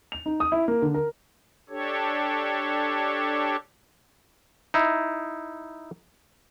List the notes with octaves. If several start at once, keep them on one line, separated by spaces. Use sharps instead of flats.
F7
D#4
D#6
E4
A#3
D3
A#4
D4 G4 A4 C#5
D#4 E4